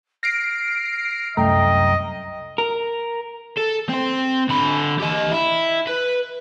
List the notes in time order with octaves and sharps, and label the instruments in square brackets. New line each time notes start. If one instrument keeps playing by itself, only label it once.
[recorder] F6 [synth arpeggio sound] A#6 C7 D7
[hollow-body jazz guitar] C2 F#2 A3 [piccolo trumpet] D#5 [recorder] G5 [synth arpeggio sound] A#5
[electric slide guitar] A#4
[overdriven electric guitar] A4
C4 C5
D3 B5
G4 D#5
E4
B4